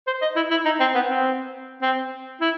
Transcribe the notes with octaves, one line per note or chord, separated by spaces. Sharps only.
C5
D#5
E4
E4
D#4
C4
B3
C4
C4
E4